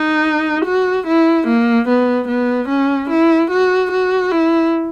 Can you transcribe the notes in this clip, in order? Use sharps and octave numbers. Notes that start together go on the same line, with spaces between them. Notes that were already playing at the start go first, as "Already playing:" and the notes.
Already playing: D#4
F#4
E4
A#3
B3
B3
C#4
E4
F#4
F#4
E4